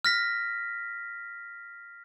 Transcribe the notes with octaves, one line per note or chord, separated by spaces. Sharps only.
F6 A#6 B6